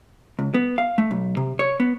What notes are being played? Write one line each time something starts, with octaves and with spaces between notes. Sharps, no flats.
C#2
B3
F5
A3
B1
C3
C#5
B3